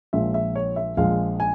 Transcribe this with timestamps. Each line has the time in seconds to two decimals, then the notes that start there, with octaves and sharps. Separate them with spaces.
0.13 A#1 A#2 F3 G#3 E5
0.34 E5
0.56 C#5
0.76 E5
0.97 A#1 A#2 F3 G#3 F5
1.40 G#5